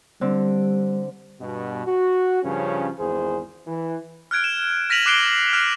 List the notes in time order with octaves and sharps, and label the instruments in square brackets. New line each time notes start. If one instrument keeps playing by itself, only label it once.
[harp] D3 C4 [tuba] G3
[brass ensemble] G2 B2
F#4
G2 C#3 F3 C#4
G#1 E2 G#4 C5
E3
[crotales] F6 F#6 G#6 D7
E7
F6 A#6 B6 D#7 F7 F#7
D6 F#6 C7 D7 G7
F6 F#6 C7 F7 G7